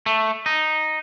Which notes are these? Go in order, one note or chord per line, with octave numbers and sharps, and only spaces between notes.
A3
D#4